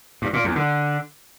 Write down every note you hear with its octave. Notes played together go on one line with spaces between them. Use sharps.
G2
A#2
E2
D3